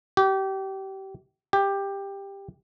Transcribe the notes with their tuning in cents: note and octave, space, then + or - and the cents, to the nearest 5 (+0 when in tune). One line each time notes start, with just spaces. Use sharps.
G4 -30
G4 +10